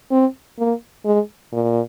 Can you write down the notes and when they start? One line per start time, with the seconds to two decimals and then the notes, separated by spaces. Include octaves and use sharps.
0.11 C4
0.58 A#3
1.05 G#3
1.53 A#2